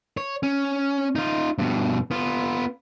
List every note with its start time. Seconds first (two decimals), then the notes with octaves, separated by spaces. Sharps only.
0.17 C#5
0.43 C#4
1.15 D#4 F4
1.58 G2 B2
2.11 B3 F4